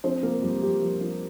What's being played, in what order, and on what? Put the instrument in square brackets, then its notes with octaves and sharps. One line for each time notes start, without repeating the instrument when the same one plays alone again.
[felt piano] F3 C4 C5
F3 A#3 A#4
F2 G3 G4
F2 G3 G4
F3
F3